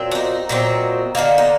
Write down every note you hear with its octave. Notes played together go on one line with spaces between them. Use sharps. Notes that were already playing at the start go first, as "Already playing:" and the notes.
Already playing: A#2 F#3 C4
D4
D#4
A#2 F#3 C4 D#4
D3 F#3 A#3 D#4
D#4